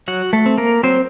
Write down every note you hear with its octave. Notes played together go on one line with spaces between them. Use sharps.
F#3 F#4 F#5
A3 A4
C4
A#3 A#4
F#3 C4 C5